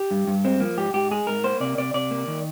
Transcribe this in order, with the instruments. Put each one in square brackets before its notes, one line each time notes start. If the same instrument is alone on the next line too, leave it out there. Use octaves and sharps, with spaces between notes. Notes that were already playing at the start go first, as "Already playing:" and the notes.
Already playing: [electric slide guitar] G4
G2
G2
G#3 C4
F3 A#3
G#2 G4
G#2 G4
G#3 G#4
G#2 A#4
A#3 C5
C3 D5
C3 D5
C3 D5
A#3
D#3